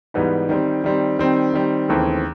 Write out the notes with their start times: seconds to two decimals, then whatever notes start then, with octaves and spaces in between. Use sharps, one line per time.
0.14 G#2 E3 G3 B3 D#4
0.49 D#3 G3 C4
0.84 D#3 G3 C4
1.19 D#3 G3 C4
1.53 D#3 G3 C4
1.88 D#2 C#3 E3 A3 C4